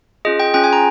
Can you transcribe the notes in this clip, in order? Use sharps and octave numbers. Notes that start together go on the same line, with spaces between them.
C#4 F4 G#4 D#5
G5
C#4 F4 G#4 G5
G#5
A#5